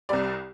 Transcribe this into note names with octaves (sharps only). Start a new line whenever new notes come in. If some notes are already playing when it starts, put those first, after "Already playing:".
C2 C3 G3 D5